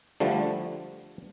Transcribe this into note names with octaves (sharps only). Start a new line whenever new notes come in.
D3 F3 G3 A3